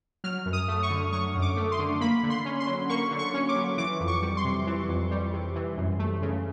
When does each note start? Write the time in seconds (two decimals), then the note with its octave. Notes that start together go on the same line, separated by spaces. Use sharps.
0.24 F#3 F6
0.46 F#2
0.53 D#6
0.68 A3
0.83 C#6
0.90 D3
1.13 F#3 C#6
1.35 F#2
1.42 D6
1.57 A3
1.72 C6
1.79 D3
2.01 A#3 B5
2.23 D3
2.30 C6
2.45 C#4
2.60 C6
2.67 F#3
2.89 A#3 C#6
3.11 D3
3.19 C#6
3.34 C#4
3.49 D6
3.56 F#3
3.78 E3 D6
4.00 F2
4.07 C#6
4.22 G3
4.37 C6
4.45 C3
4.67 E3
4.89 F2
5.11 G3
5.33 C3
5.55 E3
5.77 F#2
5.99 A3
6.22 C#3